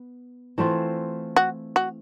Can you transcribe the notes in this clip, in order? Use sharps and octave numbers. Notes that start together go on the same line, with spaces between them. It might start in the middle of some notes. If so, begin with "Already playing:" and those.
Already playing: B3
E3 A3 C4 F4
F#4
F#4